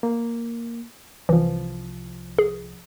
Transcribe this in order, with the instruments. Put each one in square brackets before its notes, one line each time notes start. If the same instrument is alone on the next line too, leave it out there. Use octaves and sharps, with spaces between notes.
[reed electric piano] A#3
[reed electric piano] C2 F3 [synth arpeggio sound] E3
[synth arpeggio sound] G#4